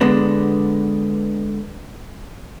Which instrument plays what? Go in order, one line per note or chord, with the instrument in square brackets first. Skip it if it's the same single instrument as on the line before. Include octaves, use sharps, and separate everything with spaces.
[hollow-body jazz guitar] D3 G#3 B3 D4